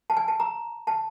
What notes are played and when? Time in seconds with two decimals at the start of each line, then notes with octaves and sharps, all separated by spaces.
0.10 A5
0.17 G#5
0.28 A5
0.40 A#5
0.87 A5